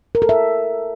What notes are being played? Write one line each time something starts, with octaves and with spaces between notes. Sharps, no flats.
A#4
A4
E5